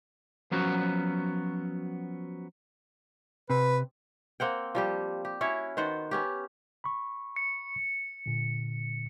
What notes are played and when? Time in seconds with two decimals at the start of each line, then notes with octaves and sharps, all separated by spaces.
0.51 F3 F#3 B3 C#4 F#4
3.50 C3 B4
4.40 A#3 C4 F#5 G5
4.75 F3 G3 G4
5.25 G4
5.41 C#4 E4 F#4 C#5
5.77 D#3 B3 C5 F#5
6.11 B3 C#4 G4
6.84 B5 C#6
7.36 C#7
8.26 A#2 D3